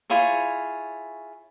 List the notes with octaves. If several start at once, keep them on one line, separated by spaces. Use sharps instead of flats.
E4 F4 G#4 C#5